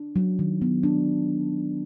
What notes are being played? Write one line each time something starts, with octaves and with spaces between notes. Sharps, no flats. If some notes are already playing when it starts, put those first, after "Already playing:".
Already playing: D4
F#3
D#3
B3
D4